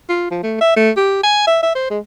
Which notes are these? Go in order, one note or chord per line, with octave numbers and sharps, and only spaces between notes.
F4
F3
A3
E5
A3
G4
G#5
E5
E5
C5
G#3